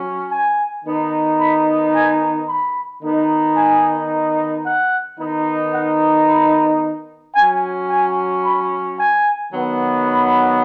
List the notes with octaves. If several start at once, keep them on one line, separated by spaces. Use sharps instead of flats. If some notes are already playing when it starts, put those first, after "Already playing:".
Already playing: F#3 C#4
G#5
D#3 B3 D#4
B5
G#5
B5
D#3 B3 D#4
G#5
F#5
D#3 B3 D#4
F#5
B5
F#3 C#4 G#5
G#5
B5
G#5
D#3 F#3 B3
B5